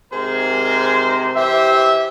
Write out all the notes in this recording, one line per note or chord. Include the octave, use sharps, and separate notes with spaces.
G#2 C3 G#4 A#4 C5
E3 G4 C5 E5